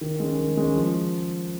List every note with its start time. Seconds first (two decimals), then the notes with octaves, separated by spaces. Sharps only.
0.01 D#3
0.20 G#3 C#4
0.38 D#3
0.57 G#3 C#4
0.76 F3